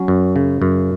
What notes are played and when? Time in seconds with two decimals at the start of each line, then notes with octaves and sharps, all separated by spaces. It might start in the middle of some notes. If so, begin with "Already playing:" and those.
Already playing: F#3 C#4
0.08 F#2
0.36 C#3
0.62 F#2